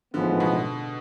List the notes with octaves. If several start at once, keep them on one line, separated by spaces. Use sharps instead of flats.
A1 G#2 D3 F3 G#3 B3
B2